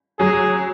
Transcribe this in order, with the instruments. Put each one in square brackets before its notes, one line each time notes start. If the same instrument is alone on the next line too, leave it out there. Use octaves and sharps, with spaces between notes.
[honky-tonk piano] F#3 [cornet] G#4